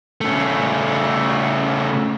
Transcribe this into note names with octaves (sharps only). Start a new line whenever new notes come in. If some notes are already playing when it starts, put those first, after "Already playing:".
C#3 A3